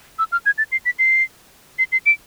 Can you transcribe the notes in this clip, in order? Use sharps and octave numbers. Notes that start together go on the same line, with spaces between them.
E6
F6
G#6
A6
C7
B6
C7
C7
C7
D7